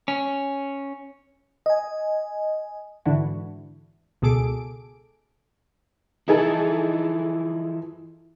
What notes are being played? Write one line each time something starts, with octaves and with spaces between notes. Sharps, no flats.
C#4
D#5 G#5
G#2 D3 E3 D4 E4 F#4
C#2 B2 G#4 A4 D6 D7
E3 F3 D#4 E4 G#4 A4